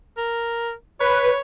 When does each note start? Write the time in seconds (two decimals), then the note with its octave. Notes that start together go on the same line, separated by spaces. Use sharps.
0.18 A#4
1.00 B4 C#5